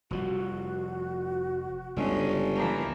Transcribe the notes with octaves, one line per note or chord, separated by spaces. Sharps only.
F1 F3 G3 F#4
G1 C#2 G#3 C#4
E3 F3 A#3